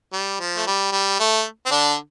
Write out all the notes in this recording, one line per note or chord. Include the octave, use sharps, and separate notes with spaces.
G3
F3
A3
G3
G3
A3
C4
D3 D4